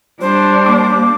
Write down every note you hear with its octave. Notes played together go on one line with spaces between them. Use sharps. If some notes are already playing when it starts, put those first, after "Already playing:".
G3 D4 C5
A#3 D6